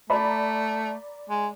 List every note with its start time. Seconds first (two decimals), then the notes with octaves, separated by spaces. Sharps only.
0.10 A3 D5 A#5 B5
1.30 G#3